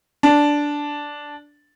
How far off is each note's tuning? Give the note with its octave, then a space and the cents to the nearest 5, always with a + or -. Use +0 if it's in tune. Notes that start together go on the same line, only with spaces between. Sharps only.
D4 -5